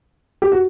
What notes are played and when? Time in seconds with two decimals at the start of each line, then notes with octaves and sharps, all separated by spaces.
0.42 G4
0.52 F#4